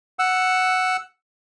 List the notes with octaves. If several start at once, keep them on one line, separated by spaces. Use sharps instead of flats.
F#5 E6